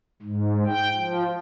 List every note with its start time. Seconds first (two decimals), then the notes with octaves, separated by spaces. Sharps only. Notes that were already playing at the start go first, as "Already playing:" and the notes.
0.22 G#2
0.66 G5
0.96 F3